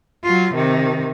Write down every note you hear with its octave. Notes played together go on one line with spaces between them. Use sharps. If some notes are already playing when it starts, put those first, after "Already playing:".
F#3 F4
C3 D#3